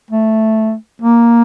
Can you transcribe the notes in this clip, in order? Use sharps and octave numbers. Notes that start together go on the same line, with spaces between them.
A3
A#3